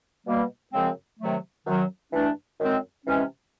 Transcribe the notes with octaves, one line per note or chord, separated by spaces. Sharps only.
B2 G3 A#3
F#2 C#3 F3 G#3 C4
C3 D#3 F#3 A3
F#2 D#3 F#3
G2 E3 A3 D4
F#2 D#3 G#3 C4
C3 E3 G#3 C#4